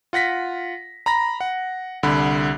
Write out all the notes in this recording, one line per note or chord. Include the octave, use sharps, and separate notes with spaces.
F4 F#5 A#6 B6
A#5 B5 A#6
F#5
C2 D3 B5